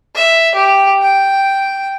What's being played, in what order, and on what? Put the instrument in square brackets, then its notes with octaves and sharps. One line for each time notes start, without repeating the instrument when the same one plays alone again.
[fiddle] E5
G4
G5